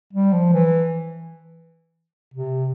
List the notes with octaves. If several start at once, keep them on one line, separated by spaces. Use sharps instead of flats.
G3
F3
E3
C3